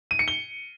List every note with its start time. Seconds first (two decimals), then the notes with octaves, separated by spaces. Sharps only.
0.11 D#7
0.19 C#7
0.28 G7